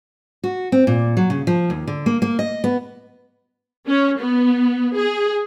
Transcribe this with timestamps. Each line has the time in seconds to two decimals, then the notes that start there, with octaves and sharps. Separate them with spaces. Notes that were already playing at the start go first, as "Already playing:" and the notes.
0.44 F#4
0.72 C4
0.87 A#2
1.17 F#3
1.30 C#3
1.47 F3
1.70 D#2
1.87 D3
2.06 A#3
2.22 A#3
2.39 D#5
2.64 B3
3.88 C#4
4.19 B3
4.95 G#4